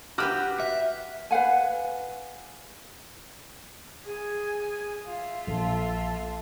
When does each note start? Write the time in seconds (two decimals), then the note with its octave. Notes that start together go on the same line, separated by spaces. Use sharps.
0.18 F#4 G4 B4 D6 F6 F#6
0.60 E5
1.31 B4 F5 F#5 G#5
4.06 G#4 G#5
5.07 F4 E5
5.47 A#1 A4